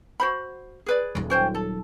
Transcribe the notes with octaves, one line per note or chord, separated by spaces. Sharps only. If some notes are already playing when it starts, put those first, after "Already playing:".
F#4 C5 B5
G#4 B4 D5
D#1 F#3
C#4 C5 G5
A4